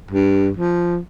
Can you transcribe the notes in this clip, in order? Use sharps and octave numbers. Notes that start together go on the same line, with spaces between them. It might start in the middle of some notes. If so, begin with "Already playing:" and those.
G2
F3